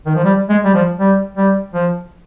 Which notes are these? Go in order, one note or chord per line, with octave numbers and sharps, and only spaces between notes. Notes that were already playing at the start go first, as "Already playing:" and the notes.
D#3
F3
G3
G#3
G3
F3
G3
G3
F3